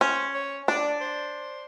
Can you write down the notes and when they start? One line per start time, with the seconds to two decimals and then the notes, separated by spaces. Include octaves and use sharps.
0.01 C#4 C5
0.35 C#5
0.68 D4 D5
1.01 C5